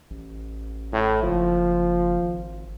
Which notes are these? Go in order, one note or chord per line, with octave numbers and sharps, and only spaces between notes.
A1
A2
F#1 F3
G#1